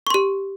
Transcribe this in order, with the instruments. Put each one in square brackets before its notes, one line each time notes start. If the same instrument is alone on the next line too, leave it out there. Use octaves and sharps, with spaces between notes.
[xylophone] C#6
C6
G4